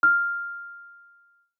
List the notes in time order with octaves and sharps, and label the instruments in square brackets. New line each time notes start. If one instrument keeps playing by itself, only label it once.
[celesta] F6